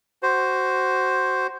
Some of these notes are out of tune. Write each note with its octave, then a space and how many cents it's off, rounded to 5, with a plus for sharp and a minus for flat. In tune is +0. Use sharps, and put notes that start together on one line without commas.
F#4 +15 C5 +0